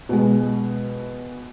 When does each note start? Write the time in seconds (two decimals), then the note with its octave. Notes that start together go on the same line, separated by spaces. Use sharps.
0.09 B2 G#3